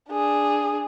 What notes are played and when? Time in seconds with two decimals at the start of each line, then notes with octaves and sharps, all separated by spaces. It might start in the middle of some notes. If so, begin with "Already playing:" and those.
0.10 D4 G#4